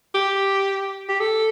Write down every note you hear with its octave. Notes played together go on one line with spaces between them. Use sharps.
G4
G4
A4